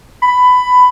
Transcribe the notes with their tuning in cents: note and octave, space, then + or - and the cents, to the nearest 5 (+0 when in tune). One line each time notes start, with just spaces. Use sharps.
B5 +15